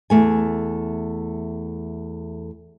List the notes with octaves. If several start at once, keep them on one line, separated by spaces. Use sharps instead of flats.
E2 A3 G#5